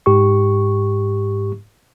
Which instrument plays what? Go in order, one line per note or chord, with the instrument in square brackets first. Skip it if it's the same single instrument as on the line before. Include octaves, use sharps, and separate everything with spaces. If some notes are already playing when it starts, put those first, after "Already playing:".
[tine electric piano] G#2 G4 C#6